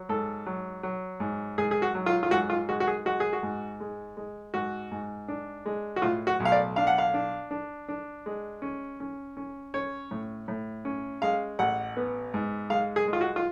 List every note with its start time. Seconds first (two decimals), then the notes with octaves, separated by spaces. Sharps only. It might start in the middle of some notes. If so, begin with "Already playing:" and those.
Already playing: F#3
0.09 G#2 A4
0.46 F#3
0.83 F#3
1.20 G#2
1.58 G#2 G#4
1.71 G#4
1.82 F#4
1.95 F#3
2.06 F4
2.23 F4
2.31 G#2 F#4
2.50 F4
2.69 G#3 F#4
2.80 F#4
2.87 G#4
3.05 G#3 F#4
3.20 G#4
3.33 F#4
3.43 G#2
3.80 G#3
4.17 G#3
4.54 G#2 F#4
4.91 G#2
5.28 D4
5.66 G#3
5.96 F#4
6.02 A2 F4
6.27 F#4
6.40 B1
6.45 F5
6.52 D5
6.76 D4 F5
6.87 F#5
6.98 F5
7.14 D4
7.51 D4
7.88 D4
8.26 G#3
8.62 C#4
9.00 C#4
9.37 C#4
9.74 C#4 C#5
10.11 A2
10.48 A2
10.85 C#4
11.22 G#3 F5
11.59 A1 F#5
11.97 B3
12.34 G#2
12.70 G#3 F5
12.96 G#4
13.08 G#3
13.13 F4
13.21 F#4
13.36 F4